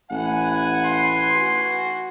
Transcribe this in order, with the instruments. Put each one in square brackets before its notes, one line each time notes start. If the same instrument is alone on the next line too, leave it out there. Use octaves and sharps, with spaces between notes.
[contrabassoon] A1 [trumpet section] B4 G#5 [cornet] F#5
[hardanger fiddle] C6
[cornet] F#4